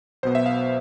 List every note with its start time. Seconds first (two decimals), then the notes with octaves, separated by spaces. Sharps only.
0.23 B1 B2 B3 C5
0.35 E5
0.46 F5